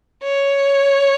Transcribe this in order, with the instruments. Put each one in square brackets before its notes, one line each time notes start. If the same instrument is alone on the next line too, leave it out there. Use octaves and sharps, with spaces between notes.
[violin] C#5